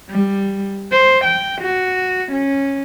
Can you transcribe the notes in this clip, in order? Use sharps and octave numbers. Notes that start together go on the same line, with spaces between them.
G3
C5
G5
F#4
C#4